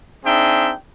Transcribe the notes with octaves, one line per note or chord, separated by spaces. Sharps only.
C4 D4 D#4 G#4 E5 G5